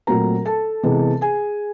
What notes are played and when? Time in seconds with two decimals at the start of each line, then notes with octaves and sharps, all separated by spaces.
0.07 A#2 F#3 A3 C4 A#4 A#5
0.45 A4 A5
0.83 C3 E3 G#3 B3
1.21 G#4 G#5